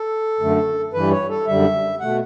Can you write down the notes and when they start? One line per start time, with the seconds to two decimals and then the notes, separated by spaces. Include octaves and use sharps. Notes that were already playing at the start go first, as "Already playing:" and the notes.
Already playing: A4
0.40 F#2 D3 A3
0.93 G2 E3 G3 B4
1.11 C#5
1.29 A4
1.47 F#2 D3 G3 E5
2.00 B2 A3 F#5